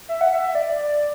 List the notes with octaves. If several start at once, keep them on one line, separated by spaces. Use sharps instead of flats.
E5
F#5
E5
D5